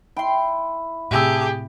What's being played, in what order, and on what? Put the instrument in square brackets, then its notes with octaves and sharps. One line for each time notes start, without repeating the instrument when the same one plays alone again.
[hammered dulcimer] E4 [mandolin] G5 C6
[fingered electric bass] A2 C3 [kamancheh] G4 G#4 [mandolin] E5 A5 E6